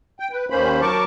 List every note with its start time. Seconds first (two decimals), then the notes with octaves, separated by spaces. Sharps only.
0.20 G5
0.32 B4
0.50 D#2 D#3 A#3 C#4 C5 B5
0.81 F#3 A#4 A5 C#6 D6